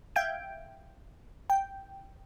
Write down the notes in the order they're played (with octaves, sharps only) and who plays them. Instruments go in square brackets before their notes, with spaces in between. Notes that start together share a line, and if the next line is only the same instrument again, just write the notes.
[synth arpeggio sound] E5 F5 G5 G6 G#6 D7
G5